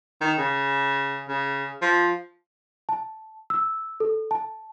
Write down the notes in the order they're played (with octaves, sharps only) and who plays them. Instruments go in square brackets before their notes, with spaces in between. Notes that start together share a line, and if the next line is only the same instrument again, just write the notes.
[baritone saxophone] D#3
C#3
C#3
F3
[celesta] A5
E6
A4
A5